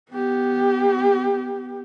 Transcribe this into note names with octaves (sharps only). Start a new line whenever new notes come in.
B3 G4